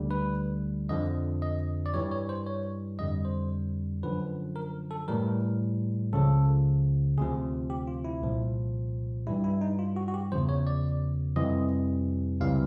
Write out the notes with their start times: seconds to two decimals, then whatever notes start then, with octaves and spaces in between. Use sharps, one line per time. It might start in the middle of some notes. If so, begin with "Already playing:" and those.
Already playing: D2 D3 G3
0.11 B4
0.89 F2 D3 F3 D#5
1.42 D#5
1.86 D5
1.94 G2 E3 G3 C#5
2.12 C#5
2.29 C5
2.47 C#5
2.99 F2 D3 G3 D#5
3.25 C5
4.03 F#2 D3 F3 B4
4.56 A#4
4.91 A4
5.08 A2 E3 G3 A#4
6.13 C#2 C#3 F3 A4
7.18 D2 C3 F3 G#4
7.70 G4
7.87 F4
8.05 E4
8.22 C2 A#2 F3
9.27 G2 E3 G3 E4
9.44 E4
9.61 D#4
9.79 F4
9.96 F#4
10.08 F#4
10.14 G4
10.31 E2 C#3 F3 C5
10.49 C#5
10.67 D5
11.36 F2 C3 E3 G3 D#5
12.41 C#2 C3 E3 G3 F5